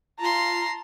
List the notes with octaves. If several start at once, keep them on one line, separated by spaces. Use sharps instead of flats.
F4 A5 A#5 C6